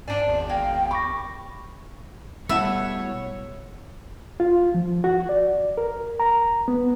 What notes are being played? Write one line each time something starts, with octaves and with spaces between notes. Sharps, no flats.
G#2 D4 C5 D5 G#5
G#1 E2
G#3 A#3 F5 G5
G4 B5 C#6 A#6
B2 G3 A3 E4 C#5 E5 F#5 B5
F4
F3
F#4
D5
A#4
A#5
B3